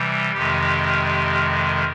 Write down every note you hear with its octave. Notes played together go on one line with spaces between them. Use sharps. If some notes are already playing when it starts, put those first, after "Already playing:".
Already playing: C3 E3 G3
F2 C3 D#3 G#3 G4